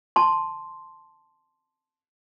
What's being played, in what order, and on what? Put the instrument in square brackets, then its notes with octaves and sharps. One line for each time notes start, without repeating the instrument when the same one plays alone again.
[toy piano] A5 C6